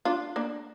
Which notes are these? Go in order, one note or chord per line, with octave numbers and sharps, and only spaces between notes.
D4 F4
A#3 D4